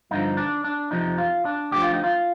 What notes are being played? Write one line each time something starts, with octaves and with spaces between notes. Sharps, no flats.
G2 D3 F3 D#4
D4
D4
F2 C3 F3 D#4
F4
D4
D2 D3 F3 G4
F4
D#4
F4